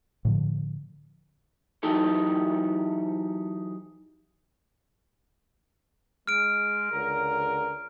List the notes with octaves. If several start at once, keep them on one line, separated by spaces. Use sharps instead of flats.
A2 D3 F3
E3 F#3 D#4 G4 A4
G#3 F6 D7
C#2 D3 A#4